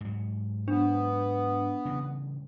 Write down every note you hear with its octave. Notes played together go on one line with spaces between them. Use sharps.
G#2 F#3
B3 D4
C#3 E3 G3